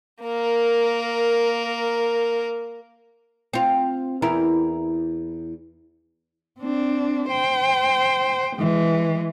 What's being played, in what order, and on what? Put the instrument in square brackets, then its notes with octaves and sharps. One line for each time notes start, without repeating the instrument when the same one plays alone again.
[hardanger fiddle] A#3 A#4
[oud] C4 F4
E2 E4 A#4
[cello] C4 D4
C5 G5
E3 G#3